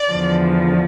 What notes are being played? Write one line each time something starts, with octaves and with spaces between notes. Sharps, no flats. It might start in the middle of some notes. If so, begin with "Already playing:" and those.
Already playing: D5
E2 D3 F3